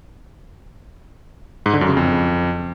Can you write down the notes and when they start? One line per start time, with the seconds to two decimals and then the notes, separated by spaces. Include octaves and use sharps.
1.66 G#2
1.73 D3
1.81 F#2
1.89 C#3
1.97 F2